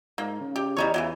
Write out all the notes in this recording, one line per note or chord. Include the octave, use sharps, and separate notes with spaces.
G#2 A#3
C#3
G4
E2 G3 D#4 C#5
E2 C#3 E3 F#3